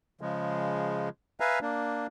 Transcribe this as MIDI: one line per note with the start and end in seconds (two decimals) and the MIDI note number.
0.21 1.09 49
0.21 1.09 53
0.21 1.09 56
1.40 1.59 71
1.40 1.59 76
1.40 1.59 77
1.40 1.59 80
1.40 1.59 82
1.62 2.07 58
1.62 2.07 62